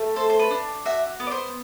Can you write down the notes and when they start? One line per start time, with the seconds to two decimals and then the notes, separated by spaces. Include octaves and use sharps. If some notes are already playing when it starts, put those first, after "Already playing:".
Already playing: A3
0.16 A4 C5
0.30 C5
0.39 B4
0.51 D4
0.85 F#4 E5
1.20 B3
1.27 D5
1.31 C5